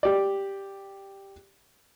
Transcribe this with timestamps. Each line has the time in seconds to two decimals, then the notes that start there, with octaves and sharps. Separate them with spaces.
0.03 G4 D5